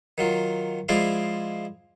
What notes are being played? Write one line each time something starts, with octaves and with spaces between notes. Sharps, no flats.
D#3 F#3 F4
F3 G#3 E4 D5 F5